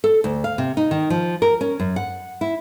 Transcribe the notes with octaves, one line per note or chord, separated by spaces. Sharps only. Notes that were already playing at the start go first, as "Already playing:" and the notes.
A4
D2
F5
C3
D#4
D#3
F3
A#4
C#4
F#2
F#5
E4